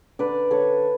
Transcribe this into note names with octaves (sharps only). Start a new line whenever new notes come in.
D3 B4 D5
D3 A4 C#5